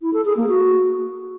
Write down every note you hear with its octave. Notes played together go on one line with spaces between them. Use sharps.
E4
A4
G#4
A#3
F#4